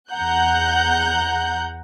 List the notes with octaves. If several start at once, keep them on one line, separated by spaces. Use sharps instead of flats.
E2 F#5 A#5 F#6 G6